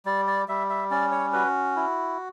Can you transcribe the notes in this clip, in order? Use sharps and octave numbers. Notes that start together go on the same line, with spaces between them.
G3 D5
D5
G3 E5
E5
C#4 D5
C#5
F#4 B4
E4